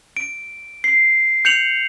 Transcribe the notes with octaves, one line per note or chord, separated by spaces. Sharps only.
D7
C7
G6 C#7 F7 F#7